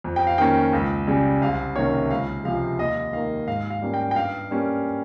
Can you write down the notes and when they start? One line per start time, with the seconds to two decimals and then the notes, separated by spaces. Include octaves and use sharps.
0.04 F2
0.16 G5
0.27 F5
0.38 D#3 A#3 C#4 G5
0.73 C#2
1.07 C#3 G3
1.41 C2 F5
1.76 C3 D#3 A#3 C#4 C#5
2.10 C#2 F5
2.44 C3 F3 G#3 F5
2.79 D#2 D#5
3.13 D#3 A#3 F5
3.47 G#2 F5
3.70 F5
3.82 G3 A#3 C#4
3.94 G5
4.11 G5
4.15 G2 F5
4.51 G3 A#3 C#4